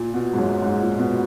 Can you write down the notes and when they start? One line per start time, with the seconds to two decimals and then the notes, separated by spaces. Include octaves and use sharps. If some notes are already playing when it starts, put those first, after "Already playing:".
Already playing: A#2
0.14 B2
0.33 G#2
0.38 F#2
0.62 G#2
0.81 A#2
0.99 B2